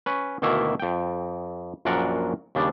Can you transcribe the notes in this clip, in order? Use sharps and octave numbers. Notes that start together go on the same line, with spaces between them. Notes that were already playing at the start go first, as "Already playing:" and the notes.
C#4 B4
D2 B2 D#3 A#3 E4 E5
F2 G5
A#1 F#2 A#2 D4 A#4 F#5
D#2 C#3 G3 D4